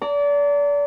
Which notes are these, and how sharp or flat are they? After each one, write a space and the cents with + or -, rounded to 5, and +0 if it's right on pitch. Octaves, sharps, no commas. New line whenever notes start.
D5 -30 A#5 -40